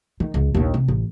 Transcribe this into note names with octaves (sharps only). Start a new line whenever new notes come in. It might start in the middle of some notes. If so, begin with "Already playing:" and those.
D#3
C#2
A#1 D#2
C3
A1